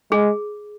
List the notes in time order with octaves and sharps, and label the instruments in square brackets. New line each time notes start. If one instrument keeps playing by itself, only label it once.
[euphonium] G#3 [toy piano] G#4